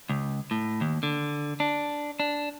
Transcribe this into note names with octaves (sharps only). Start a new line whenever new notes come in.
C#2
A2
D#2
D3
D4
D4